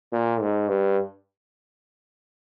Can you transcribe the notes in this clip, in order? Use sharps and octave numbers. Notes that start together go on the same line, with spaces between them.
A#2
G#2
G2